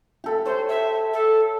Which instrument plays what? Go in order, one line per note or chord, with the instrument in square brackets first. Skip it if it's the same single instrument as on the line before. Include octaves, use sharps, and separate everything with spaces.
[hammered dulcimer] G4 A4 B5
[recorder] C5 [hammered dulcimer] C#5
[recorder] E5
A4